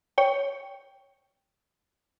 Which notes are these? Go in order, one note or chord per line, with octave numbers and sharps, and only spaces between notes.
C#5 G5